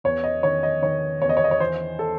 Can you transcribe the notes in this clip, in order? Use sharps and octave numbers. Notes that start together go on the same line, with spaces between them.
E2 C#5
D#5
D#3 C#5
D#5
D#3 C#5
E2 C#5
D#5
C#5
D#5
C#5
E3 C5
A4